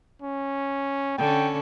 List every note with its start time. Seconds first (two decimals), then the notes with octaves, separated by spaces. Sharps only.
0.22 C#4
1.18 D3 C#4 G5